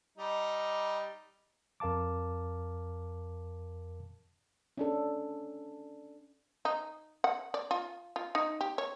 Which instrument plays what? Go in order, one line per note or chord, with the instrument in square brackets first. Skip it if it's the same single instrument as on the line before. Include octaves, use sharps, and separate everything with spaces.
[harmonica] G3 D#4
[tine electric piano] F2 A#4 F5 A5 D6
[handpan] C#4 D4 A4
[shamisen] D#4
F#5
D5
F4
F4
D#4
G4
C#5